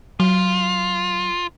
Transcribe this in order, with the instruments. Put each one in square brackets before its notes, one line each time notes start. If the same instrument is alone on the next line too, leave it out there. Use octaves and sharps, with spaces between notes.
[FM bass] F#3 [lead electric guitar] F4